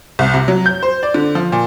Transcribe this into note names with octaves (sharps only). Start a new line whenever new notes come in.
C2
C3
F#3
G6
C5
D5
D3
F3
A#2